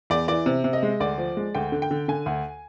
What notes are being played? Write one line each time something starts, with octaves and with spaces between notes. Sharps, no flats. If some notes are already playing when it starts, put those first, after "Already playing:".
E2 D5
E3 D5
C3
C3
D#5
G#3
D2 D5
F3
G#3
D2 G5
D3
G5
D3
D3 G#5
D2